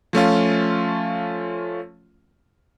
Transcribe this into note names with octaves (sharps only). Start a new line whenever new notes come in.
F3 A3 C#4 F4